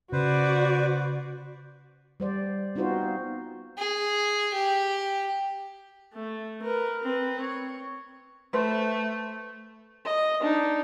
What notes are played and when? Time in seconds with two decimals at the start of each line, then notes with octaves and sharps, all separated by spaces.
0.12 C#3 F#4 B4 C5 D5
2.20 G3 C5 D5
2.75 B3 C4 D#4 F4 F#4 C5
3.78 G#4
4.54 G4
6.13 A3
6.62 A#4 B4
7.03 C4 B4
7.40 C#5
8.53 A3 B4 C5
10.05 D#5
10.40 D4 D#4